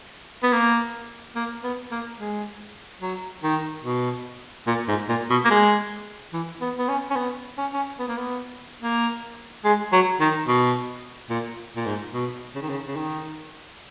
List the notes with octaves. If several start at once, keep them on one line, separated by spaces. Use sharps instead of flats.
B3
A#3
A#3
B3
A#3
G#3
F#3
D#3
B2
A#2
G#2
A#2
B2
A#3
G#3
E3
B3
B3
C#4
C#4
B3
C#4
C#4
B3
A#3
B3
A#3
G#3
F#3
D#3
B2
A#2
A#2
G#2
B2
C#3
D#3
C#3
C#3
D#3